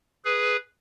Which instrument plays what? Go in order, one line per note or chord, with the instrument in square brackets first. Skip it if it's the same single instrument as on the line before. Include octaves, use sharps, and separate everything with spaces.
[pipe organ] G#4 B4